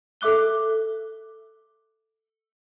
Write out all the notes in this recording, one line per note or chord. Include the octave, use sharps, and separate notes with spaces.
A4 E5 D6 F#6 G7